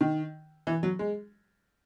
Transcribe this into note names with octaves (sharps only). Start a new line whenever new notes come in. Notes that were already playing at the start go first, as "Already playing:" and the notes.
D#3
E3
F#3
G#3